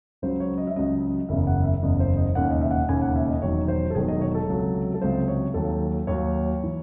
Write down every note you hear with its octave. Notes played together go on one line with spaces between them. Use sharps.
C#2 C#3 F#3 C5
C#5
D#5
E5
C#2 C#3 F#3 D#5
F#1 E2 C#3 E5
F#5
E5
F#1 E2 C#3 D#5
C5
D#5
E1 D#2 C#3 F#5
D#5
E5
F#5
E1 D#2 C#3 G#5
F#5
E5
D#5
E1 E2 D#3 F#3 C#5
C5
A4
E1 E2 D#3 F#3 G#4
D#5
C#5
A4
C#2 C3 F#3
A4
C#2 C3 F#3 C5
C#5
D#2 D#3 F#3 A4
D#2 D#3 F#3 C#5
E3